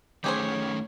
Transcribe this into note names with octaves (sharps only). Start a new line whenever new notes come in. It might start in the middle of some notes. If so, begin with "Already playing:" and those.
D#3 A3 C#4 G4 G#4 C5 C#5